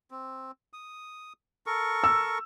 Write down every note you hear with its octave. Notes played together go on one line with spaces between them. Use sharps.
C4
D#6
A4 A#4 C#6
E6